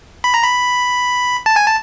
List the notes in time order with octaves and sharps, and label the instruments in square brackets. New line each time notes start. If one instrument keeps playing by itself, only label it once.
[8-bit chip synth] B5
A#5
B5
A5
G#5
A5